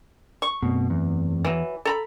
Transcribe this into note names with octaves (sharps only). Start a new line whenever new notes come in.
C#6
F#2 B2 A3 C4
E2
E3 F#3
A4 A#5 B5